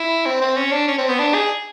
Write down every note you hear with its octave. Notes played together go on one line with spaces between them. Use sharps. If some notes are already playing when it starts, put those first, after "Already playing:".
Already playing: E4
C4
C4
C#4
D4
C#4
C4
B3
D4
G#4